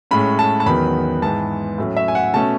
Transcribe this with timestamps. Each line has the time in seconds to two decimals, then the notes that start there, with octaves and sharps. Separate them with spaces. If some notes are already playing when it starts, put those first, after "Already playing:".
0.11 A2 G#3 C#4 B5
0.39 A5
0.60 A5
0.66 E2 D#3 F#3 B3 B5
1.22 G#2 E3 B3 A5
1.78 A2 F#3 A3 C#4
1.97 E5
2.08 G#5
2.15 F#5
2.34 B2 A3 C#4 A5